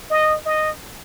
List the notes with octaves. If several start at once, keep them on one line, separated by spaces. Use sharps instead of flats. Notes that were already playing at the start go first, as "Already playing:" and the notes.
D#5
D#5